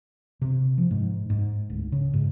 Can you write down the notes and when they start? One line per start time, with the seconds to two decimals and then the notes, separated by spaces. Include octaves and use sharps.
0.42 C3
0.78 F3
0.91 G#2
1.30 G#2
1.70 D1
1.92 C#3
2.14 G#2